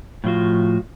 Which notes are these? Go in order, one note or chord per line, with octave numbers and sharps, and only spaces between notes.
A2 F3 F4 F#4